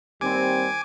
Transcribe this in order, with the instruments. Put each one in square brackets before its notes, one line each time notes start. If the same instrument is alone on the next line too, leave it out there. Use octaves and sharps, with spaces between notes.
[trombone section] D#2 G3 C4 [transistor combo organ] G#5 D6